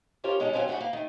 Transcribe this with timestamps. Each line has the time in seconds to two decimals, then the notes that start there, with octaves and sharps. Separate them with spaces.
0.24 C#4 F4 G4 A#4 C5 C#5
0.39 B2 G#3 C#4 D#4 F#4 A4
0.53 D#3 F#3 G#3 C#4 C5 F5
0.68 D3 A3 F#4 G#4 B4
0.81 A#3
0.93 D#3 A3